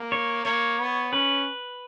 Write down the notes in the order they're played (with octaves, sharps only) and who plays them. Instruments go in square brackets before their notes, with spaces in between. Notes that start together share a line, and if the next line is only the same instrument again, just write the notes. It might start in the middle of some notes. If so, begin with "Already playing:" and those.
Already playing: [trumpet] A#3
[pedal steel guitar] C#5
[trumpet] A#3 [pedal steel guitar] C#5
[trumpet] B3
[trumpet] C#4 [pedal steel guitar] B4